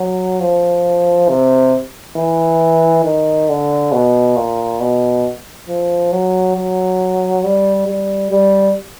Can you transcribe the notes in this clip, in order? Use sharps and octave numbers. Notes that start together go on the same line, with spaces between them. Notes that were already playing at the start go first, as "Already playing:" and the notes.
Already playing: F#3
F3
C3
E3
D#3
D3
B2
A#2
B2
F3
F#3
F#3
G3
G3
G3